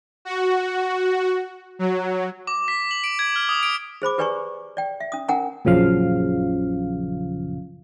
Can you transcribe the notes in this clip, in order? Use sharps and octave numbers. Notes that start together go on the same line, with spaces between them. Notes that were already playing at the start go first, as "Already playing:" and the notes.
F#4
F#3
D6
B6
F#7
D7
G#6
F6
D#6
D7
G#4 C5 B5 D6
G4 B4 D5 G#5 A#5 C#6
D5 G5
E5
C#4 D#6
C#4 A#4 F#5 G#5 A#5
A#1 F#2 C#3 F3 F5